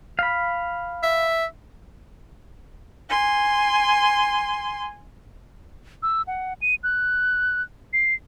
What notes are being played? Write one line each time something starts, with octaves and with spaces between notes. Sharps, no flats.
F5 B5
E5
G#5 C6
E6
F#5
D#7
F#6
C7